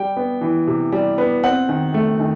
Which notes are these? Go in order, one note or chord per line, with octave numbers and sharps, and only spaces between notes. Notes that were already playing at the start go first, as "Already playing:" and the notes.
Already playing: G3 G5
B3
E3
C3
G3
B3
C4 F#5
D#3
A3
D#3